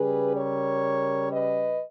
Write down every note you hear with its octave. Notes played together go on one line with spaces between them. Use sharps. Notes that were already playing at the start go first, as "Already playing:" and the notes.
Already playing: C#3 G3 G#4 B4
A#4 C#5
B4 D#5